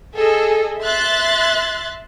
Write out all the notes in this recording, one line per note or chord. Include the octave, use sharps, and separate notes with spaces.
G#4 A4 D#5
E5 C6 F#6 A6